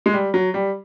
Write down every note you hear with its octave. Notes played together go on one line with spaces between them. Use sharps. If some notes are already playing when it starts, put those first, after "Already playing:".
G#3
G3
F#3
G3